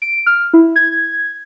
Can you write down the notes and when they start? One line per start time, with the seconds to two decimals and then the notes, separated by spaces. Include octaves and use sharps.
0.02 D7
0.26 F6
0.53 E4
0.76 G#6